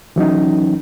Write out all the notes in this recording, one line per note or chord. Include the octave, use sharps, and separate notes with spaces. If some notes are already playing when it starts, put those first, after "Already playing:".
E3 F#3 C#4 D#4